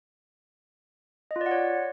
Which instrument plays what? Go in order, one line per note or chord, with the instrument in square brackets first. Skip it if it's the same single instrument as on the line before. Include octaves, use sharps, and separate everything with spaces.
[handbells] D#5
F4
D5
F#5
C#5